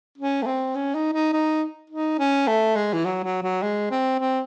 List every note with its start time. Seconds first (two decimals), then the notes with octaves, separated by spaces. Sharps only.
0.18 C#4
0.42 A3
0.46 C4
0.75 C#4
0.94 D#4
1.13 D#4
1.33 D#4
1.90 D#4
2.19 C#4
2.47 A3
2.76 G#3
2.93 E3
3.05 F#3
3.24 F#3
3.43 F#3
3.62 G#3
3.91 C4
4.20 C4